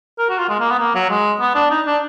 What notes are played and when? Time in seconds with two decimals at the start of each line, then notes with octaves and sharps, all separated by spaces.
0.19 A#4
0.30 F#4
0.39 F4
0.49 G#3
0.60 A#3
0.70 B3
0.79 A#3
0.95 F#3
1.10 G#3
1.41 B3
1.55 D4
1.71 D#4
1.86 D4